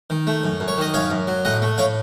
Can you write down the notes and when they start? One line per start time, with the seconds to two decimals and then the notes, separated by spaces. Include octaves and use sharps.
0.10 D#3
0.27 A3
0.44 F#2
0.60 F#2
0.68 C#5
0.78 D#3 D#5
0.94 F#2 C#5 F5
1.11 F#2
1.27 F#3
1.45 A2 D#5 F#5
1.62 A3
1.78 A2 C#5 F5